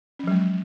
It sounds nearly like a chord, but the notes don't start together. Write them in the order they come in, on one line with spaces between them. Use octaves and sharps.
C#4 F3 F#3 G#3